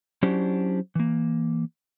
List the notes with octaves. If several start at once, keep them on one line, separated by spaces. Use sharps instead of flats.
F#3 C#4 D4 E4 G4 C5
E3 A#3